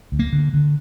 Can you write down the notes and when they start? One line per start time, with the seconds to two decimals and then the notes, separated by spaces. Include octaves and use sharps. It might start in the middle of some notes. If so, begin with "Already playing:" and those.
0.12 D2
0.19 A#3
0.33 D3
0.54 D3